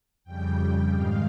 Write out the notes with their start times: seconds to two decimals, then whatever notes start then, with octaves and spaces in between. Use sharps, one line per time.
0.24 F2 C#3 G3 G5
0.91 G#2 D#3 G#3 F5